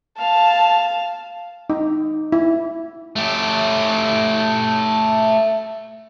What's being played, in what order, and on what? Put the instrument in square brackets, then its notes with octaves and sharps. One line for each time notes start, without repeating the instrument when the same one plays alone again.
[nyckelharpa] F5 [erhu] A5
[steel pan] D#4
E4
[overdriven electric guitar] A3 G4